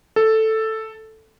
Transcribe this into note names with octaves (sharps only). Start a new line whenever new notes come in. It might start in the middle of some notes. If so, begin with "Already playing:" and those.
A4